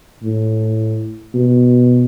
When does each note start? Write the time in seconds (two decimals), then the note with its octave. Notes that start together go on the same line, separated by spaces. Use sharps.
0.23 A2
1.35 B2